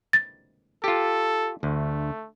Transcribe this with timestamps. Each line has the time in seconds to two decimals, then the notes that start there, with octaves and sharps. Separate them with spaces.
0.13 A6
0.84 F4 G4 A4
1.63 D2 A3